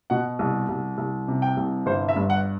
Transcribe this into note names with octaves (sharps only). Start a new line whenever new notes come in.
B2 F#5
C2
C2
C2
C3
G5
C2
G1 C5
E5
G2
F#5